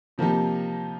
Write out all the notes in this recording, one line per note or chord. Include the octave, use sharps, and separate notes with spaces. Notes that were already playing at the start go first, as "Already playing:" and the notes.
C3 F3 A#3 D#4 G4